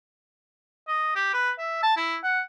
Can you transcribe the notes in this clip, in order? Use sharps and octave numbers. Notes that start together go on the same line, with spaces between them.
D#5
G4
B4
E5
A5
E4
F#5